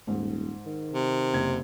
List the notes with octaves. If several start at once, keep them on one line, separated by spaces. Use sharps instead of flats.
D#1 G#2
D#3
C3
F#1 G#6